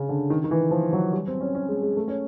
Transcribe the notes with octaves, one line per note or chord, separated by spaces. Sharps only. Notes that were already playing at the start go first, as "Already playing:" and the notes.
Already playing: C#3
D3
D#3
D#3
E3
F3
F#3
G3
C4
C#4
C#4
G#3
G#3
A3
C#4